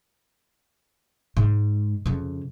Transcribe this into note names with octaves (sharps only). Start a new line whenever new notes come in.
G#2
F2 C#3